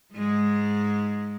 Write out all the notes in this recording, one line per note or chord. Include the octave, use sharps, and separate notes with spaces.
G#2 G#3